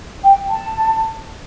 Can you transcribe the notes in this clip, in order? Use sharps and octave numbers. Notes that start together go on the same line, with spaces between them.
G5
A5